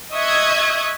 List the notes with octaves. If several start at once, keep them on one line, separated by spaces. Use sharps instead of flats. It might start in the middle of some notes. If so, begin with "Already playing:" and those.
D#5 E5 C#6 D#6 F#6 G#6